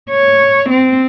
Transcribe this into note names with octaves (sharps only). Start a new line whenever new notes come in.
C#5
C4